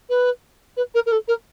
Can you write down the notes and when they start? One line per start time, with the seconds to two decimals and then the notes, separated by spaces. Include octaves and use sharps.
0.09 B4
0.77 B4
0.94 A#4
1.06 A#4
1.12 A4
1.28 A#4